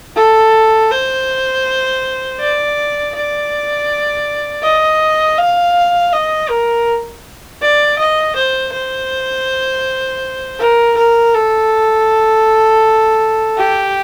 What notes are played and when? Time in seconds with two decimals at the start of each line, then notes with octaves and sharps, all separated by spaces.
0.16 A4
0.91 C5
2.40 D5
3.15 D5
4.63 D#5
5.38 F5
6.13 D#5
6.49 A#4
7.62 D5
7.98 D#5
8.36 C5
8.73 C5
10.59 A#4
10.97 A#4
11.35 A4
13.58 G4